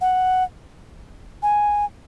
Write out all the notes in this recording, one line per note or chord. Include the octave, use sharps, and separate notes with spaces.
F#5
G#5